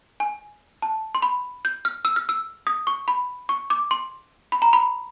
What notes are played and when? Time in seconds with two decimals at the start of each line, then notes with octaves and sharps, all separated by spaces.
0.20 G#5
0.82 A5
1.15 C6
1.22 B5
1.65 G6
1.85 F6
2.05 E6
2.16 F6
2.29 E6
2.67 D#6
2.87 C#6
3.08 B5
3.49 C#6
3.70 D6
3.91 C6
4.52 B5
4.62 A#5
4.73 B5